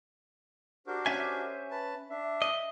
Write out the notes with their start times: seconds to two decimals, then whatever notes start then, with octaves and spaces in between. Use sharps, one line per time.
0.87 D4 F#4 G4 A#4 C5
1.06 C#4 E5 G#5
1.71 B4 A5
2.10 D4 E5
2.42 D#5